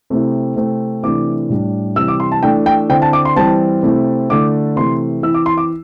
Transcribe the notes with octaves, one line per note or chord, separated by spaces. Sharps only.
C3 A3 C4 E4
C3 A3 C4 E4
C3 E3 A3 D4 D6
A2 G3 D4
C3 E3 G3 E6
D6
C6
A5
E3 A3 D4 G5
G5
D3 C4 E4 G5
A5
D6
C6
E3 G3 C4 A5
C3 A3 C4 E4
D3 A3 E4 D6
C3 E3 A3 C6
E3 C4 E4 E6
D6
C6
D6